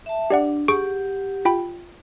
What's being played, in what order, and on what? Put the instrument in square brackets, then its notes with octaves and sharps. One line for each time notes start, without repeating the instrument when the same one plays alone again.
[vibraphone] E5 A5
[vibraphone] D4 [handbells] G4 D5 F#5
[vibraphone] G4 F#5 [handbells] G#4 C#6 D7
[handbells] F4 G5 B5